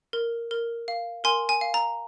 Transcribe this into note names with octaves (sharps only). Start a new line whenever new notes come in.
A#4
A#4
F5
A#4 G#5 C6
G#5
F5
A#5